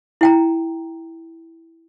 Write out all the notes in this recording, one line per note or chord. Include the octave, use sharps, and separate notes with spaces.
E4 G5 A#5